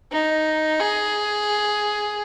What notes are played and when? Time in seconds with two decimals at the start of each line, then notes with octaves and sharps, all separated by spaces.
0.12 D#4
0.80 G#4